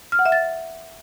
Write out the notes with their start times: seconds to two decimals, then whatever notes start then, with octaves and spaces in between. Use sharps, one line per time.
0.12 F6
0.19 F#5
0.26 E5
0.32 A6